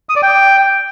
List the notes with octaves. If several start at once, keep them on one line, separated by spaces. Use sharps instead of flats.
D#6
D5
G5